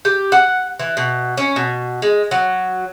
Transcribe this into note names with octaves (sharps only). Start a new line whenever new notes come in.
G4
F#5
E3
B2
C#4
B2
G#3
F#3